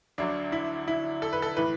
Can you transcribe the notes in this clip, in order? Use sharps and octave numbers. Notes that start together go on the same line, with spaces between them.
D2 D3 F#3 D4
E4
E4
A4
B4
A4
A2 E3 B4